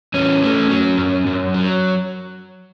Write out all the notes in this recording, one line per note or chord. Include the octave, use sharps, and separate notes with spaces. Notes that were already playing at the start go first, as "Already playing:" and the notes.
E2 C#4
A3
F#3
F#2
F#2
F#3